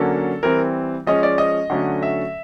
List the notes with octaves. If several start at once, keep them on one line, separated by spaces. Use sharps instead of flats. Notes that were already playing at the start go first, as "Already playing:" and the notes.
Already playing: D3 F#3 A#3 C#4 A4
E3 G3 C4 A#4
F3 G#3 C#4 D#5
D5
D#5
D3 F#3 A3 C#4
E5